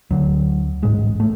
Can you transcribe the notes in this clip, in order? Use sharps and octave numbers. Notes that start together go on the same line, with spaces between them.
D2 D3 F#3
A1 G#2 G#3
A3